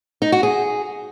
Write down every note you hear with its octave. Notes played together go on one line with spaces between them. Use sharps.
D#4
F#4
G#4